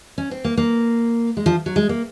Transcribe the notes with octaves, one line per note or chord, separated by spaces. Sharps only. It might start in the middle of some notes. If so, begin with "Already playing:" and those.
C#4
C4
A#3
A#3
G#3
F3
F#3
G#3
A#3